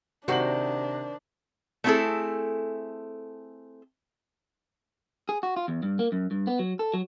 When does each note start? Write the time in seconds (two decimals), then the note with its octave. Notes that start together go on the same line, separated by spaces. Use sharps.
0.28 C3 D#3 D4 F#4 C5 D5 F#7
1.84 A3 B3 C4 E4 G#4 A4
5.29 G#4
5.43 F#4
5.56 F4
5.68 E2
5.83 G2
5.99 A#3
6.12 F#2
6.31 G2
6.47 B3
6.59 F#3
6.79 A4
6.94 F#3